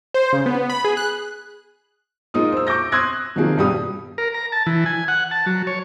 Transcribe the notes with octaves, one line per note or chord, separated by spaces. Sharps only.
C5
C#3
B3
B5
G#4
F#6
G#3 A#3 D#4 F4 D#6
C5 E6
C#6 D6 E6 G6 A#6
C6 D#6 E6 F#6 G#6 A#6
C3 D#3 F3 F#3 A#3 G#4
G2 B2 G3 G4 D#6
A#4
A#5
A5
E3
G#5
F#5
A5
F#3
C#5